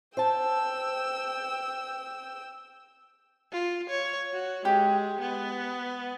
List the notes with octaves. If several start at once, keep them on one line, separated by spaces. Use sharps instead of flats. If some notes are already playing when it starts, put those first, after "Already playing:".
C5 G5 A5 E6
F4
C#5
F#4
G#3 G4
B3